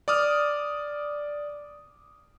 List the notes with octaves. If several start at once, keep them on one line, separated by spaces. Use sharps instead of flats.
D5 D6 D#6 F6